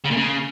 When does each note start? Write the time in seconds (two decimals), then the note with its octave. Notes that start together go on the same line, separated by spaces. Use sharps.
0.04 C#3
0.10 A#2
0.17 C#3